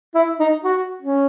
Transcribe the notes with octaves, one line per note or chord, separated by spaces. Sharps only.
E4
D#4
F#4
C#4